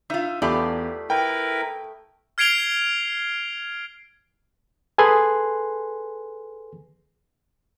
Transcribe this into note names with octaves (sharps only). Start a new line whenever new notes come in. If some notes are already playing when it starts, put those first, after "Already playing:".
D#4 F4 E5
E2 A3 F4 G4 D5 B5 D#6
E4 A#4 B4 G5
F6 G#6 C7 D7 F7 G7
G#4 A4 B4 G#5 C6 F#6